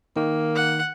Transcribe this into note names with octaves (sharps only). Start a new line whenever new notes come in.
D#3 A#3
F#5